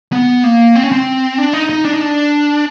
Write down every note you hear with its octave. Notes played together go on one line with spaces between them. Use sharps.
B3
A#3
C4
C#4
C4
D4
D#4
D#4
D4
D#4
D4